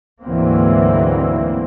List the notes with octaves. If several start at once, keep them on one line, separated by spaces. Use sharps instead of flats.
D2 G#2 E3 F#3 A#3 C4